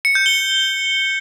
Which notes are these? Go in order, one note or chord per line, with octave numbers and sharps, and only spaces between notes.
C#7
G6
G7